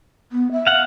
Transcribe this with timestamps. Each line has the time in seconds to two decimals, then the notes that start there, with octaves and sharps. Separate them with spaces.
0.32 B3
0.52 E5
0.67 F5 F#5